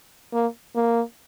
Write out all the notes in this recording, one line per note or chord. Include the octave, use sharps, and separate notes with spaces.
A#3
A#3